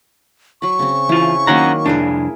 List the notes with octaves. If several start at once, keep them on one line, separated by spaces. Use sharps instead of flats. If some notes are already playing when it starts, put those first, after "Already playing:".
F#3 B5 C#6
C#3 C4
E3 E4 F4
D#3 F#3 A#3 C#4 F#5 A#5
C2 F2 D4 E4 G#4 A#4